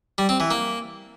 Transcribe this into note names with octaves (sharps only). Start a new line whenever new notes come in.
G3
C4
E3
A#3